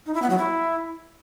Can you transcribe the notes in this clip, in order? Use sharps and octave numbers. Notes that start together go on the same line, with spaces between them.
D#4
E4
B3
F#3
E4